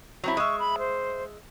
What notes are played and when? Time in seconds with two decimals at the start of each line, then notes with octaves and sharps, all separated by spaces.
0.24 F#3 C4 E4
0.37 G#3 E5 C#6
0.59 B5
0.78 C5